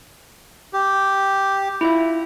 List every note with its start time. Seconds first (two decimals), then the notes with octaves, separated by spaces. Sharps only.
0.73 G4
1.81 E4 F4 E5